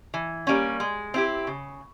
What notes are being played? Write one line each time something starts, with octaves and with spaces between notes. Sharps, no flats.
E3
G3 A#3 C#4
G#3
C4 E4 G4
C#3